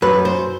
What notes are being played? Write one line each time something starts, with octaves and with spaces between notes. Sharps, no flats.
F#2 B4
C5